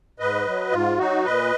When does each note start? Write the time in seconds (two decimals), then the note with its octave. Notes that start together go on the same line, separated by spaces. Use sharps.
0.19 G#2 B4 D#5
0.47 F#3
0.72 G#2 F4
0.98 F#3 D#4 F#4
1.25 A#2 B4 D#5